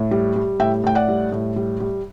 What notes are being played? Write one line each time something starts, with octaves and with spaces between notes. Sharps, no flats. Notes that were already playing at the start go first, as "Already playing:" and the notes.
Already playing: A2
G3
G3
A2 E5 G5
A2 G5
D5 F#5
G3
A2
G3
G3